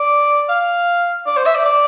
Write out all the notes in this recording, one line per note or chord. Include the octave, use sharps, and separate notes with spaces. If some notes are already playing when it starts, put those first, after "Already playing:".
Already playing: D5
F5
D5
C5
E5
D5
D5